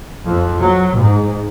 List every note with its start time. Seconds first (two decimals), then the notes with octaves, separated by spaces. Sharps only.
0.24 F2
0.59 F#3
0.98 G#2